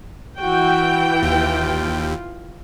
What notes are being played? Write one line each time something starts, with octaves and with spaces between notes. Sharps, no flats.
E3 F#4 G5
D#2 F4